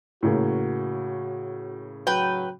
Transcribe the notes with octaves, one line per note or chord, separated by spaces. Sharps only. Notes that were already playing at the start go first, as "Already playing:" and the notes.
A2 C#3 A#3 F#4
F#3 B4 G5